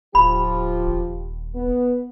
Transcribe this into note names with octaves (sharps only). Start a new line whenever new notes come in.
D1 F3 F4 G4 B5
D#1
B3